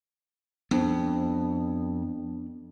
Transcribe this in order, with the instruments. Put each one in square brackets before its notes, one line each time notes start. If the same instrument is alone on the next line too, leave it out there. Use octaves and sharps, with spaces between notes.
[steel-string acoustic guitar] F2 [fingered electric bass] B3 D4